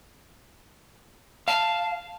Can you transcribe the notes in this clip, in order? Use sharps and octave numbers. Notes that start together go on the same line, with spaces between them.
F5 A5